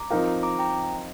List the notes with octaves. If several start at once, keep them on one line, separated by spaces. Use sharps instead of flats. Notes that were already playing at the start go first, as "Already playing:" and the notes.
Already playing: A#5 D6
F3 C4 D#4 A#4 F5
A#5 D6
G5 A#5